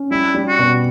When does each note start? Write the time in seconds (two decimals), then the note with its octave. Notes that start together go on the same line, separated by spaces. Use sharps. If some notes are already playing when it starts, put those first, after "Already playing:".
Already playing: C#4
0.11 G3 E4
0.34 G3
0.47 F#4
0.59 B2